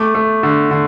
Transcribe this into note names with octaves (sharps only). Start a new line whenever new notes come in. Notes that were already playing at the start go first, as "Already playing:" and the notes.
Already playing: A3 D6
A3
D3
D3